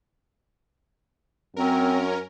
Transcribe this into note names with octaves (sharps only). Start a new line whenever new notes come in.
F#2 C4 C#4 A#4